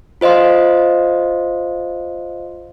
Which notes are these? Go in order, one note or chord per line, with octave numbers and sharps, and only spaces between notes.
F4 C5 D#5 F5 C6